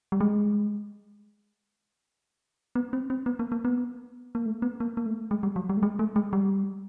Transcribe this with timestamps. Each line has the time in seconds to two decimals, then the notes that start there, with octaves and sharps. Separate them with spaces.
0.12 G3
0.21 G#3
2.75 B3
2.93 C4
3.10 C4
3.26 B3
3.39 A#3
3.52 A#3
3.65 B3
4.35 A#3
4.46 A3
4.62 B3
4.80 A#3
4.97 A#3
5.06 A3
5.31 G#3
5.43 G3
5.56 F#3
5.69 G3
5.77 A3
5.83 G#3
5.99 A3
6.16 G#3
6.33 G3